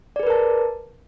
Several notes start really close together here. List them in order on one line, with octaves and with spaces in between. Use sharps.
D5 G#4 B4 A#4 A5